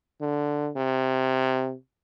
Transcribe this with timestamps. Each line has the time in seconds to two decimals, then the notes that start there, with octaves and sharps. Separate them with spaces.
0.21 D3
0.76 C3